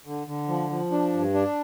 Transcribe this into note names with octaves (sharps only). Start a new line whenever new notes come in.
D3
D3
F3
F3
D4
G2
D4